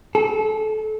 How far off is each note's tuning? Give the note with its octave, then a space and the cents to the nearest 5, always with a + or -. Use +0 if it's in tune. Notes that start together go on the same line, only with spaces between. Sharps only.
A4 -25